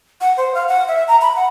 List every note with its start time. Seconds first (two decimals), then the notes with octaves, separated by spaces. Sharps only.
0.21 F#5
0.37 C5
0.55 F5
0.68 F#5
0.88 E5
1.08 A#5
1.22 B5
1.36 F#5